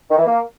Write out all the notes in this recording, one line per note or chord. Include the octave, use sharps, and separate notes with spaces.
D#3
E3
A#3